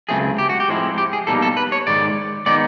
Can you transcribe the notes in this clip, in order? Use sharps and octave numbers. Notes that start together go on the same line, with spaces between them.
C#2 C#3 F#3 A3 C4 G#4
G4
F#4
G4
A2 F3 G#3 C4 E4
G4
G#4
B2 G3 A#3 D#4 A4
A4
B4
C#5
G#2 D#3 G#3 D5
D#3 G#3 B3 D#4 D5